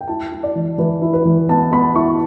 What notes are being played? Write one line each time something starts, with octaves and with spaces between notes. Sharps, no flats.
G5
E4 A5
E4
D5
E3
E3 B4
E4
B4
E3
B3 A5
B3 B5
E4 C#6